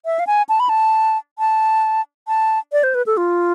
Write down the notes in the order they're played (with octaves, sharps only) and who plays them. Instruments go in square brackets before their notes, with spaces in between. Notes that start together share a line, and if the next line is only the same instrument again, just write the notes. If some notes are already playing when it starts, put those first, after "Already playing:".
[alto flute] E5
F5
G#5
A5
B5
A5
A5
A5
D5
C5
B4
A4
F4